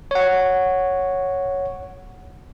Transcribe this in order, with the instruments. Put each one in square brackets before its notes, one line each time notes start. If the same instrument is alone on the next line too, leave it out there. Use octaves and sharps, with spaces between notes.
[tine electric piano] C#5 F#5